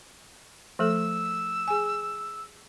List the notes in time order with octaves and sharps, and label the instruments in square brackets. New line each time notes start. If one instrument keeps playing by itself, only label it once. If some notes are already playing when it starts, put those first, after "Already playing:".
[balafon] F3 A3 A4 [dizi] E6
[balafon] G#4 G#5